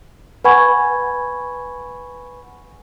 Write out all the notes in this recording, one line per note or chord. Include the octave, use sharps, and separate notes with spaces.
B4 F#5 G#5 B5 C#6 G#6